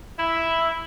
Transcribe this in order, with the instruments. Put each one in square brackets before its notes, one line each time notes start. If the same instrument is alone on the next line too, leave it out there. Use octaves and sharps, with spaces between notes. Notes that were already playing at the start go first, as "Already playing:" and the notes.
[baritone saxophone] E4 [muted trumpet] E5